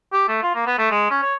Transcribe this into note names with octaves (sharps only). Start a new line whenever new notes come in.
G4
A3
F4
A#3
B3
A3
G#3
C#4
C#5